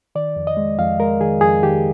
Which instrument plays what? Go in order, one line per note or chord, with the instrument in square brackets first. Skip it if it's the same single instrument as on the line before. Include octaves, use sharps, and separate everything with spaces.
[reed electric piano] D#3 D5
F2
D#5
G#3
F2 F5
G#3 A#4
D#3 G#4
F2 G#4
D#3 G4